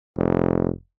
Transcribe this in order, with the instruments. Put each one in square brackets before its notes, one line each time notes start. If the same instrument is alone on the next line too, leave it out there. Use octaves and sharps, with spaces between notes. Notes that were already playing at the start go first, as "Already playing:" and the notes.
[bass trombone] F1